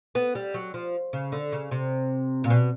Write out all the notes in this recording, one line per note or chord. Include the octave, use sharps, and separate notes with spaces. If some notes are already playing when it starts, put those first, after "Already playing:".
B3
G3
F#3
F3
C#3
D3
C#3
C3
A#2
B2